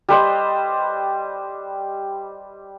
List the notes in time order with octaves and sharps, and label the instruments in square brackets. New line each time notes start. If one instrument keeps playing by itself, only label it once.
[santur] G3 B4 C5 D#5